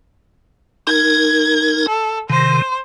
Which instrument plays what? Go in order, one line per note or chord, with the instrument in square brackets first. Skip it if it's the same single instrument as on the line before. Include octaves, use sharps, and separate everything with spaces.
[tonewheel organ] D#4 A#4 [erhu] G#6
[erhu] A4
[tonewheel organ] C3 D#3 [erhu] C5